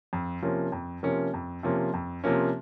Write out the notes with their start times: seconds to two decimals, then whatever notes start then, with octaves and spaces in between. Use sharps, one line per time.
0.13 F2
0.42 C3 F3 A#3 C#4
0.72 F2
1.03 C3 F3 A#3 C#4
1.34 F2
1.63 C3 F3 A#3 C#4
1.94 F2
2.24 C3 F3 A#3 C#4